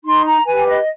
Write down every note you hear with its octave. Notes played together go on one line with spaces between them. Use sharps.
D#4 C6
A#5
G4 B4 G#5
D#5